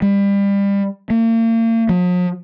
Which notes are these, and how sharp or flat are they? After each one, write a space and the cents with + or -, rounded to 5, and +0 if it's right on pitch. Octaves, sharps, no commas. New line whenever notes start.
G3 +30
A#3 -40
F3 +45